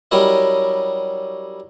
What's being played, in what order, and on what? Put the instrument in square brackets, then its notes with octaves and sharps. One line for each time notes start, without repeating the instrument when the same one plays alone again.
[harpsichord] F#3 G3 C#4 E4 A#4 D#5